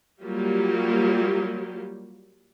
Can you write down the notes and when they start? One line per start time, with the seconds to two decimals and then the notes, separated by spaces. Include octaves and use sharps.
0.22 F#3 G3 A#3 F4 G4